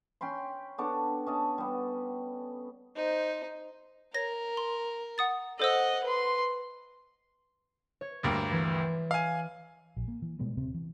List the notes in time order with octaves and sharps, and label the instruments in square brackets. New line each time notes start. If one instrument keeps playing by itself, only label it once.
[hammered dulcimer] C#4 G5 B5 C6
B3 D4 A4 C#5
C#4 D#5 A5
G3 B3
[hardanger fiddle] D#4 C5
[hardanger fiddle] A#4 [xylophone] C#5 A#6
[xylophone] C6
F#5 D#6 A6
[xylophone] A4 C5 E6 [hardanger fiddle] D#5 F#5
[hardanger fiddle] B4 C6
[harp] C#5
[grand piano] D2 G2 A#3
[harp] E3
[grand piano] F5 G#5
[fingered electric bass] A#1
A#3
E3
B2 G3 G#3 B3
D#1 C3 C4
E3